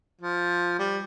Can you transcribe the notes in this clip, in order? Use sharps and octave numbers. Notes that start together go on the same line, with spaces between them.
F3
G3